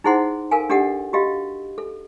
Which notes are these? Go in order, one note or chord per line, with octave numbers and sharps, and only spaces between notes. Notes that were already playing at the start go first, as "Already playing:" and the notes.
D#4 E4 G#4 C5 F#5 C6
A4 A#4 F5 G#5
D4 G4 A4 D#5 F#5
F#4 G4 D#5 F5
A4